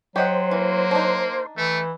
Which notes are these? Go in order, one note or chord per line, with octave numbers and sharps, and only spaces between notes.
F#3 G4 C5 D#5 F#5
E3 A#3
D4 D#4
E3 A3